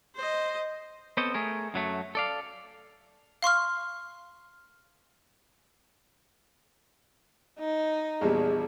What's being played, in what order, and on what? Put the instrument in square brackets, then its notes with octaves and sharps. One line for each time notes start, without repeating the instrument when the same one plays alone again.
[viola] C5 D#5
[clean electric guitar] B3 C4 A4 C5 C#5 D#5
A3 G#4 A#4
F#2 F#3 A3
A4 D5 F5
[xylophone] F5 C6 C#6 F6
[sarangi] D#4
[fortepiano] A#1 E2 G3 [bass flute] G#4